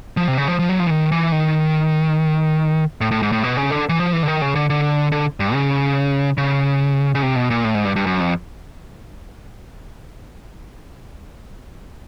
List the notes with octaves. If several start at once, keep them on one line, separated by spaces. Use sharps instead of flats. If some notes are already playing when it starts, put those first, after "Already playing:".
F3
C3
C#3
F3
F3
F#3
F3
E3
D#3
E3
D#3
A2
A2
G#2
A2
B2
C#3
D3
E3
F3
E3
D3
D#3
C#3
D3
D3
D3
G2
C#3
C#3
C#3
C3
B2
A#2
A2
G#2
G2
G2
F#2
F2